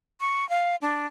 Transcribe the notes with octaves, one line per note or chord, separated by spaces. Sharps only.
C#6
F5
D4